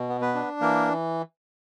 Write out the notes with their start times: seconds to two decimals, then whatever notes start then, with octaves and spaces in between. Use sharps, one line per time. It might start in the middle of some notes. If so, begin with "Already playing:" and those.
Already playing: B2
0.09 B3
0.21 B3 B4
0.34 D4
0.61 E3 A#3 A#4